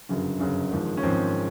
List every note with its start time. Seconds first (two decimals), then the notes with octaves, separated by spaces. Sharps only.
0.09 G1 F#2 C#3 F#3
0.40 G1 F#2 C#3 F#3
0.71 G#1 G#2 F3
0.97 C#4
1.03 G#1 G#2 F3 C4